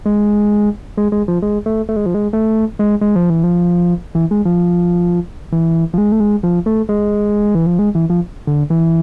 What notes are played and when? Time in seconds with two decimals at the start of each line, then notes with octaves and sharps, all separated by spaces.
0.06 G#3
0.97 G#3
1.12 G#3
1.28 F3
1.42 G#3
1.66 A3
1.89 A3
1.96 G#3
2.06 F3
2.14 G#3
2.33 A3
2.79 G#3
3.01 G#3
3.16 F3
3.30 E3
3.44 F3
4.15 E3
4.31 G#3
4.45 F3
5.52 E3
5.94 F3
5.98 G#3
6.12 A3
6.20 G#3
6.43 F3
6.66 A3
6.89 G#3
7.55 E3
7.66 F3
7.79 G#3
7.95 E3
8.10 F3
8.47 D3
8.70 E3